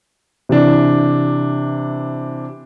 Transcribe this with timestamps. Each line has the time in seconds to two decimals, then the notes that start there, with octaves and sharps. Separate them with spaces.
0.49 C3 E3 D4